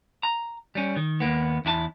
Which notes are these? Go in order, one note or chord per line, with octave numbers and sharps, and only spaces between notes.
A#5
G3 C#4
D#3
D#2 A#3 B3
E2 E4 F#4 A5